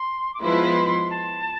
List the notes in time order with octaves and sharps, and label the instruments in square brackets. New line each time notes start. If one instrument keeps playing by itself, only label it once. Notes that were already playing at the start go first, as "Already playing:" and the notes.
Already playing: [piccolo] C6
D6
[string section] F3 G#3 B3 E4 B4 [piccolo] C6
[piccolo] A5